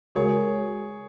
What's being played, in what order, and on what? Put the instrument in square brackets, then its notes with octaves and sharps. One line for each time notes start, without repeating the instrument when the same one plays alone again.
[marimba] C#3 G#3 F#4 A#4 [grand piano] G#4 C#5